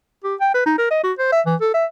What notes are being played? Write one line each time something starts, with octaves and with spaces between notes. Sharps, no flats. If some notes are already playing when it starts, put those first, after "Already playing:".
G4
G5
B4
D#4
A#4
D#5
F#4
C5
E5
E3
A4
E5